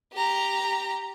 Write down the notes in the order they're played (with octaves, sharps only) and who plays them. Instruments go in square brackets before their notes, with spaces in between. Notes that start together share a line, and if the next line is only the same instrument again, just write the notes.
[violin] G4 A#5